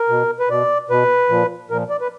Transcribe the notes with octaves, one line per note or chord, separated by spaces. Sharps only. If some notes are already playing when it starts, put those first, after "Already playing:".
Already playing: A#4
B2
B4
B2 D5
B2 B4
A#2 F3
A#2 F3 A#4
D5
B4